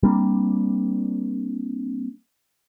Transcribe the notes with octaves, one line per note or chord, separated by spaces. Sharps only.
G3 A#3 C4 D4